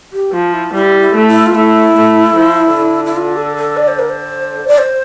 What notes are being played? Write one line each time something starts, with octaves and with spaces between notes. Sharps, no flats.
G4
F3 F4
E4
G3 E4
E4
A3
E4
F4
A3 E4
A3
F3
D3
E4
F4
A4
A4
D5
C5
A#4
C5
D5
C5